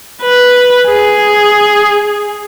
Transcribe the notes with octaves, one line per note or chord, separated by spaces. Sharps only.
B4
G#4